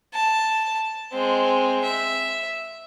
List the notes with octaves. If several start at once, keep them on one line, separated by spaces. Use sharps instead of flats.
A5
G#3 C4
E5